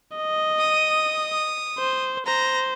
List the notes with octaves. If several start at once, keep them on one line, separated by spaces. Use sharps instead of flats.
D#5
D#6
C5
C5 A#5